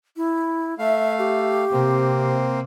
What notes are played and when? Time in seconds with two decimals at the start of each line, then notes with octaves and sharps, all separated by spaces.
0.17 E4
0.79 A3 E5 F5
1.19 G4
1.72 C3 A#3 C4